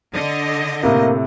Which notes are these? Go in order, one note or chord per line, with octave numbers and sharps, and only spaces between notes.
D3 D#5
A2 C3 A#3